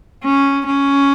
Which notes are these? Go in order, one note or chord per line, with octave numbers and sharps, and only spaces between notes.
C#4
C#4